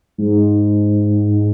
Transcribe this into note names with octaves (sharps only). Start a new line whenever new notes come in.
G#2